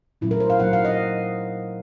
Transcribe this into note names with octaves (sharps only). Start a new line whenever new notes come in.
A#2 F#3 A3 C#4 E4
A#4
C5
F5
A#2 F#3 A#3 D#4 F#5
F5
D#5